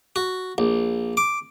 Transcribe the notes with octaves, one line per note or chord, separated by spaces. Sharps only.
F#4
A#1
D6